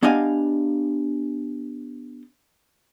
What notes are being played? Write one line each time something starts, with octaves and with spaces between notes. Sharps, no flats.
B3 D4 G4 D#5 F5 G#5